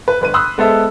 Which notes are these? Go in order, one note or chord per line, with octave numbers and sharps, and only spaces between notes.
B4
G1 B4 D#7
B5 C6 D#6 E6 F#6
G#3 B3 A4 C5 E5